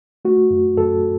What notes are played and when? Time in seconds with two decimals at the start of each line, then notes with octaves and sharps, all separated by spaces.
0.25 A3 F#4
0.50 F#2
0.77 F#2 A4